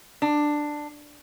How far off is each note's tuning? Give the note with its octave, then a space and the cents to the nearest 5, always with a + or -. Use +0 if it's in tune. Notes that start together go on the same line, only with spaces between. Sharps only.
D4 +10